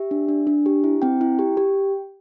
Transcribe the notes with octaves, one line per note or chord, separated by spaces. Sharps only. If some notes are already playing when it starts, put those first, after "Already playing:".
Already playing: G4 E5
D4
D4
D4
G4
E4
C4 G5
E4
G4
G4